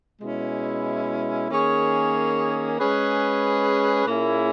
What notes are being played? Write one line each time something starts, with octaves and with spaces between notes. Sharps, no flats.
B2 G#3 C#4 E4
D#3 A#3 C#4 G#4 C#5
G#3 C#4 G#4 B4
A#2 A#3 C#4 E4 G#4